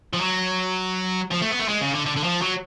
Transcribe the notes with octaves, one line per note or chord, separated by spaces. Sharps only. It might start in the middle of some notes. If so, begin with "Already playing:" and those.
F3
F#3
F3
A3
B3
A3
G#3
C#3
D3
D3
D3
F3
F#3